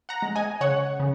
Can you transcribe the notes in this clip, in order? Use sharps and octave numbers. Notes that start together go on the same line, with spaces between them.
F#5 A#5
G#3
D#5 G#5
C#3 C#5 F#5
C#3